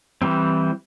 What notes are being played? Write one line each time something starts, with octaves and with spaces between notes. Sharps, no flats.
E3 G3 C4